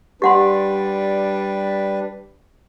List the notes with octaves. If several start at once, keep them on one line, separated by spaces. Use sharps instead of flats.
G3 D4 G4 B4 F#5 C6